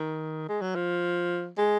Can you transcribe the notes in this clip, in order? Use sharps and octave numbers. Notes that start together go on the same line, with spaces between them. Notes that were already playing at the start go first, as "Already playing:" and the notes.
Already playing: D#3
G#3
F#3
F3
G#3